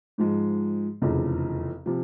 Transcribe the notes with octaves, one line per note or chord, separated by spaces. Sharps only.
G#2 F3 G#3
F1 E2 C#3 F3
C3 F3